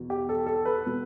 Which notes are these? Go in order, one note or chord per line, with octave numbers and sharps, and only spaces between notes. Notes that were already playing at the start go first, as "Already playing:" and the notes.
Already playing: E2 B2
G4
A4
A4
B4
B2